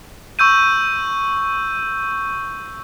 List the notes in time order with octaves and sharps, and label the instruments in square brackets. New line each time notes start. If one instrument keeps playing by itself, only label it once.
[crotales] C#6 E6 G6 D#7